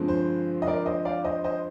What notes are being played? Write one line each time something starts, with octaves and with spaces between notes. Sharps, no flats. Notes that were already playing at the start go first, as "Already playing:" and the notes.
Already playing: G2 D3 F3 G#3 C4
C5
D#5
A#4 D5
C5 D#5
D5 F5
C5 D#5
C5 D#5